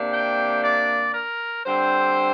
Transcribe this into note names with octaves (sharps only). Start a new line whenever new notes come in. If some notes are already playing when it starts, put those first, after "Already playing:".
Already playing: C3 A#3 D4
G5
D5
A#4
D3 G3 C4 C5